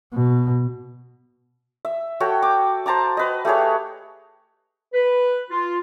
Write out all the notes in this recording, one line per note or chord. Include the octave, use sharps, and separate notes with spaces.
B2
E5
F#4 A4 C#5 G5
D6
C5 A5 A#5 D6
B4 D#5
A3 G4 G#4 C#5
B4
F4